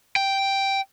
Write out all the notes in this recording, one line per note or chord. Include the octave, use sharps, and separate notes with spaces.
G5